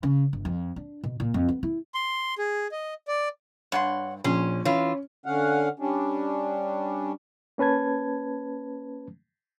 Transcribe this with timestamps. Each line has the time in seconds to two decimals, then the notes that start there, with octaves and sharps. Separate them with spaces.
0.03 C#3
0.33 G1
0.45 F2
0.76 D4
1.04 B2
1.20 A#2
1.34 F2
1.49 B3
1.63 E4
1.94 C6
2.38 G#4
2.72 D#5
3.08 D5
3.72 G2 C#5 F#5 C6
4.24 A#1 C#4 C6
4.65 E3 C#4 F4
5.26 D3 C#4 F5 F#5
5.79 G3 C#4 D4
7.58 A#3 C#4 B4 A5 G#6